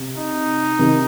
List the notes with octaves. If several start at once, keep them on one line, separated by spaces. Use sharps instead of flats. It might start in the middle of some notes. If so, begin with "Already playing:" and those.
Already playing: C3
D#4
C3 D#3